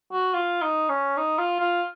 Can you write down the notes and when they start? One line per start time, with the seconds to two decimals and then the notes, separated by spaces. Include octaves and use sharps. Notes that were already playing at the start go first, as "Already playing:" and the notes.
0.12 F#4
0.34 F4
0.62 D#4
0.89 C#4
1.17 D#4
1.39 F4
1.60 F4